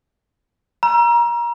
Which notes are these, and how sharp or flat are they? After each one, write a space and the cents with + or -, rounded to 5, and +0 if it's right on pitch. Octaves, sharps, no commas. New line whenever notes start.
A#5 +25 E6 +35